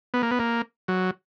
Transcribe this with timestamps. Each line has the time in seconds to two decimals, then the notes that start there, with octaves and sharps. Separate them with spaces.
0.14 B3
0.23 A#3
0.31 B3
0.39 A#3
0.88 F#3